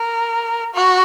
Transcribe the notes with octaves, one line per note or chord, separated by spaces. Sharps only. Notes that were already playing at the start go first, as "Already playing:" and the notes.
Already playing: A#4
F#4